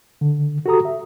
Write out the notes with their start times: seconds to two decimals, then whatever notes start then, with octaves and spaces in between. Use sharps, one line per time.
0.21 D3
0.66 F#4 G4 A4 A#5 D#6
0.85 E5